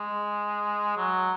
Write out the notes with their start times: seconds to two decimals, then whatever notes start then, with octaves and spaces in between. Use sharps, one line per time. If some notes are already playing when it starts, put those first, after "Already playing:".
Already playing: G#3
0.97 F#3